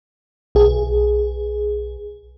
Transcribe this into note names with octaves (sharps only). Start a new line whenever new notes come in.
B1 G#4